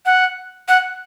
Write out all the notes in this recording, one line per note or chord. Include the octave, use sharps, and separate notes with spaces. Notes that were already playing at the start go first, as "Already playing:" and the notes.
F#5
F#5